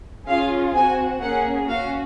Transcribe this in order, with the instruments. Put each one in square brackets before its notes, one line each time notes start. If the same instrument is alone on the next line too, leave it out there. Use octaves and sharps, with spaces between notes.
[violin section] C#4 F4 G#4 F5
C4 F#4 G#5
A#3 C#4 G#4 F#5
C#4 F#4 F5